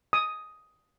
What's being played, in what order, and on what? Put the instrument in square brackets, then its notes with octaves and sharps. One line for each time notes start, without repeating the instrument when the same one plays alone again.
[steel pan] D#6